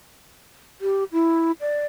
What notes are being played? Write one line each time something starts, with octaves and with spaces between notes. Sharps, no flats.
G4
E4
D5